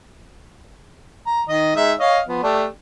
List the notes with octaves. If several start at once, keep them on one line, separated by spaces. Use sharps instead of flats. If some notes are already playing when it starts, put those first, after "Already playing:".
A#5
D#3 D#5
G#3 D#4 E5
C#5 D#5 F5
F3 B3
A3 D4 G4